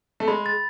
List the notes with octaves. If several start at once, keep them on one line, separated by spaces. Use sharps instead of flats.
A3
G#3 B5
A6